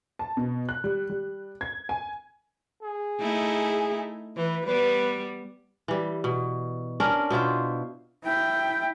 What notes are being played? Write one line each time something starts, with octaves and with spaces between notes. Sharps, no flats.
A5
B2
F#6
G3
G3
G#6
G#5
G#4
A3 D#4 E4
E3 B4
G3 B3 B4
E3 G3
B2
C#4 D4 A#4
B2 E4 F4 C5
E4 G5